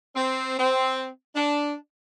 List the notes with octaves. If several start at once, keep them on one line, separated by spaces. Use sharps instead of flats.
C4
C4
D4